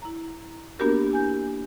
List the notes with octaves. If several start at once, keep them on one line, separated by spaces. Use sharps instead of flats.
E4 A#5
A#3 B3 D4 F#4 G4 A#4
E4 G#5 G6